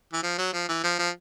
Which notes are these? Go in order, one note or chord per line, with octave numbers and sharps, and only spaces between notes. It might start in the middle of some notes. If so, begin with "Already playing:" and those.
E3
F3
F#3
F3
E3
F3
F3